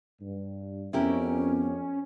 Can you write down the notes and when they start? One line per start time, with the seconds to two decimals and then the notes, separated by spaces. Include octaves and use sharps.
0.20 G2
0.93 F2 B3 C#4 E4 G4 A#4